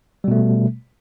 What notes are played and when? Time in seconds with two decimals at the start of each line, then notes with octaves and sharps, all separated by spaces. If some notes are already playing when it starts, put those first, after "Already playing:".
0.24 G3
0.28 B2
0.31 A3